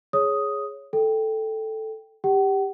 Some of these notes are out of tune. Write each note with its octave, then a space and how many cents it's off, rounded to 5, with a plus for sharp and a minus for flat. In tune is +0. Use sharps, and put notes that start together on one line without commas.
G#4 +0 C#5 +0 D#6 +5
A4 +0 G5 +0
G4 +10 F#5 +40